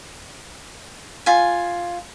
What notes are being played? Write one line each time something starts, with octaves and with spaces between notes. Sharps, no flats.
F4 G#5